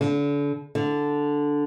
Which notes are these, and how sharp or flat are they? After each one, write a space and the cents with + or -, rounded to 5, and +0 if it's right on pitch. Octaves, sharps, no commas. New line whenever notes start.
D3 -35
D3 -5